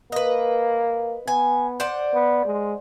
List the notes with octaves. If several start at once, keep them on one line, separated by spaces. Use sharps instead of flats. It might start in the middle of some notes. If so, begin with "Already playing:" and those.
A#3 B4 D#5
B3 G#5
C5 D5 F#5
B3
G#3